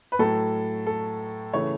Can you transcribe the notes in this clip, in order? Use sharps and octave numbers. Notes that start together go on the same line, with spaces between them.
B4
A2 F#3 A3 A4
A4
C#3 E3 A3 C#5